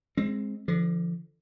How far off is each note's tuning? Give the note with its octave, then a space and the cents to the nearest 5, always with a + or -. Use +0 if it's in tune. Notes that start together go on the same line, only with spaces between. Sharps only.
G#3 +0 C4 +20
D3 +0 F3 -30